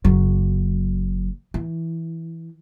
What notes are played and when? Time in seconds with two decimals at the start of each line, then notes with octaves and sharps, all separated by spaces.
0.05 F#1 F#3
1.54 E3